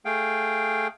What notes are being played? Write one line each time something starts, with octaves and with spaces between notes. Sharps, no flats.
A3 G#4 F5 G5